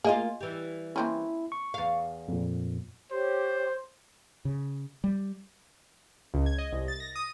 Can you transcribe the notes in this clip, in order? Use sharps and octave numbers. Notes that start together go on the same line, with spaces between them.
A#3 F4 G#4 D#5
E3 G3
A#3 C4 C#4 E4
C#6
E2 F5
F2 A#2
G4 C5 C#5
C#3
G3
C#2
G#6
D#5
C2
A6
A#6
D#6